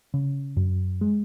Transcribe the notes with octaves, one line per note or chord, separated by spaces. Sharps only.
C#3
F#2
G#3